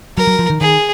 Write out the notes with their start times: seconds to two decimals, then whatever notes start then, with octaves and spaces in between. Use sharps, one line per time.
0.17 F#3 A#4
0.27 F#3
0.39 F3
0.50 D#3
0.60 D#3 G#4